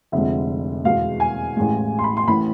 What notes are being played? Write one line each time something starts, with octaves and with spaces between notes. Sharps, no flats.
F1 F2 D3 G#3 E5
E2 B2 G#3 F5
G#5
A1 A2 G#3
C6
B5
C6
A1 A2 E3 B5